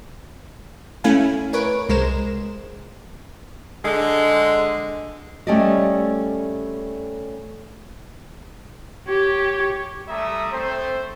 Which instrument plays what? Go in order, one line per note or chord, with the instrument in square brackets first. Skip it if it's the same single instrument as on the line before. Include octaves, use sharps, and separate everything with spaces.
[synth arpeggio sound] A3 C#4 E4 F5 G#5
A#4 B4 C#5 D7
C2 G#3 A#4 C5 E7
[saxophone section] D3 G#3
[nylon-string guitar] G3 A3 C#4 G4 D5 D#5
[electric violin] G4 [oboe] C#5
[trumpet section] G3 A3 E5 A#5 D#6
A3 C4 C5